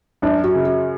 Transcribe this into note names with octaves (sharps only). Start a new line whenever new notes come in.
F#2 D4
F#4
C#3
F#4